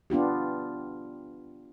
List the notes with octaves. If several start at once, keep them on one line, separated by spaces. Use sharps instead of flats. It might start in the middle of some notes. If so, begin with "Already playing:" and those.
B3 D4 F4 G4